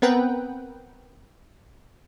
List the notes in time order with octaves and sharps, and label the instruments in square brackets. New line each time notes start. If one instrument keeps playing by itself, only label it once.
[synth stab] B3 C4 A#4 B4 F#5 G5